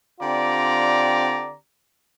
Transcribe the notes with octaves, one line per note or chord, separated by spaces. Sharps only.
D3 C4 F4 G4 D5 A#5